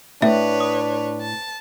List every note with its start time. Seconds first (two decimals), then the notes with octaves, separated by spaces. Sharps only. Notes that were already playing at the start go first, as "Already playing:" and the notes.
0.22 A2 D4 B4 C#5 E5
0.60 D#6
1.21 A5